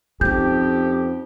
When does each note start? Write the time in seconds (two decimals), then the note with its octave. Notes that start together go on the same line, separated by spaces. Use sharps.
0.21 F2 C#4 D#4 G4 G6